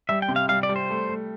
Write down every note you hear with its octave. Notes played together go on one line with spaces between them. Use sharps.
G3 E5
G5
C3
F5
G3 F5
D5
G3
C5
A3
A3